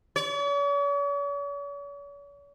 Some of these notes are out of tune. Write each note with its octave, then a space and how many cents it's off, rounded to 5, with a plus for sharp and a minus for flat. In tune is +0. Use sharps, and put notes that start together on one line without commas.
C#5 +45